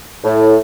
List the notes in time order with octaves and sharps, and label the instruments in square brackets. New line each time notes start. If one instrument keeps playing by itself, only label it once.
[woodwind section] A2